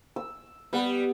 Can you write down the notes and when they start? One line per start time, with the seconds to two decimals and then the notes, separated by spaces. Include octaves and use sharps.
0.16 E6
0.73 G3 B3